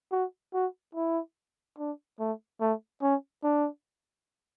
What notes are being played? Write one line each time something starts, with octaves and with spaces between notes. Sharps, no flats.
F#4
F#4
E4
D4
A3
A3
C#4
D4